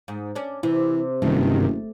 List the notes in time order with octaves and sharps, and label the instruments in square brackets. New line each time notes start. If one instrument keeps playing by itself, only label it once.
[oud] G#2
C#4 D4
[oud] C3 [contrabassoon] E3
[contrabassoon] F#1 [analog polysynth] G2 C3 D#3 [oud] A3